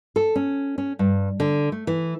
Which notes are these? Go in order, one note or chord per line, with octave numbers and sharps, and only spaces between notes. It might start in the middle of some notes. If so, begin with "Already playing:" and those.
A4
C#4
C#4
G2
D3
A3
E3